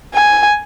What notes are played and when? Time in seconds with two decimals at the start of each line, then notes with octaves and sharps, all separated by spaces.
0.15 G#5